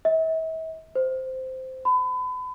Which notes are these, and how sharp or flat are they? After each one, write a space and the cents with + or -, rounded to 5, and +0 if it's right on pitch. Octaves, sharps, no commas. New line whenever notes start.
E5 -40
C5 -10
B5 +35